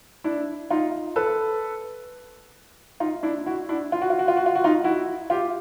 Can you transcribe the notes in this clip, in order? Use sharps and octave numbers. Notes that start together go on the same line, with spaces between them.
D4 E4
D#4 F4
A4 B4
D#4 F4
D4 E4
E4 F#4
D4 E4
F4
F#4
F4
F#4
F4
F#4
F4
F#4
D#4 F4
E4 F#4
F4 G4